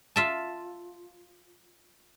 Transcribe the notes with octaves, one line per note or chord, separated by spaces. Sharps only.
F4 E5 A5